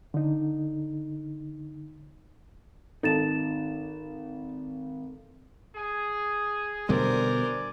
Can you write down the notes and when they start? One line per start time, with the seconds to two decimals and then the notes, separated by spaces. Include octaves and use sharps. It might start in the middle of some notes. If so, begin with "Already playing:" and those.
0.14 D3 D#4
3.03 G#1 D#4 A4 A5 A6 E7
5.75 G#4
6.89 B2 D3 G3 D4 A#4 C5 D5 G#5